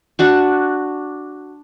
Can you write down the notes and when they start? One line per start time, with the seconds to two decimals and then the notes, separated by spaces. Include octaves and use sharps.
0.19 D4 F#4 C#6